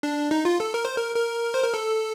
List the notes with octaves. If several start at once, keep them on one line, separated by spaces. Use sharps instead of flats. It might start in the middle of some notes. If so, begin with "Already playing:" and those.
D4
D#4
F4
A4
A#4
C5
A#4
A#4
C5
A#4
A4